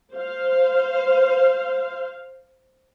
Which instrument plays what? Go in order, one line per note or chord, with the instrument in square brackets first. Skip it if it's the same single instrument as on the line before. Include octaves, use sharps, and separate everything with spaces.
[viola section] C5 F5